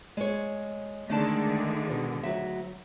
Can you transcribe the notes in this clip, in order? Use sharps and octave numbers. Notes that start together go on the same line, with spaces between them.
G#3 C#5
D3 D#3 G#3 A3 D4 A5
B2
D2 F#3 E5